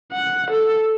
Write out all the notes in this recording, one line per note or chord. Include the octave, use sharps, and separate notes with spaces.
F#5
A4